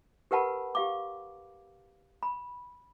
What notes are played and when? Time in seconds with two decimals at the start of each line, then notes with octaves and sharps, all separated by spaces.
0.31 G4 A#4 B4 F#5 A5 B5
0.75 G4 F5 D6
2.23 B5